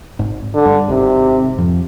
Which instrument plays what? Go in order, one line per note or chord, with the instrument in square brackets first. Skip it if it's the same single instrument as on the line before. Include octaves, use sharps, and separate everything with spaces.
[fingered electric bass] G#1 G#2
[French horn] D3
[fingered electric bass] G2
[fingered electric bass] G#1 G#2 [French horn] C3
[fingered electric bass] F2 F3